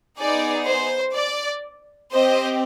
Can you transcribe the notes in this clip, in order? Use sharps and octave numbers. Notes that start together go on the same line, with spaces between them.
B3 D#4 G#4 D5
C5
D5
C4 G4 C5 D#5